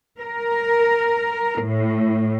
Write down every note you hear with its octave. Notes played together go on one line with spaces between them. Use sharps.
A#4
A2